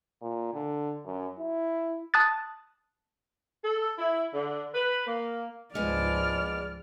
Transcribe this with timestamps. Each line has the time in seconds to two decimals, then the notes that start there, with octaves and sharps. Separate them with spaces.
0.22 A#2
0.54 D3
1.06 F#2
1.39 E4
2.14 A5 D#6 F#6 A6
3.64 A4
3.98 E4
4.34 D3
4.73 B4
5.06 A#3
5.75 C#2 G#2 F3 G#3 B3 D5 F6